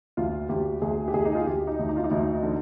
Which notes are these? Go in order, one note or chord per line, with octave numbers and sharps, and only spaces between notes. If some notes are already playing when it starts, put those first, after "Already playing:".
D2 F4
D2 G4
D2 G#4
G4
D2 G#4
D#4
F4
D2 G4
D#4
D2
D#4
F4
D#4
D2
D3